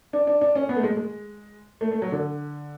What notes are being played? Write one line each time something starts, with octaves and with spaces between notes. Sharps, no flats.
D4
D4
D4
C#4
B3
A3
G#3
G#3
A3
A3
F#3
D3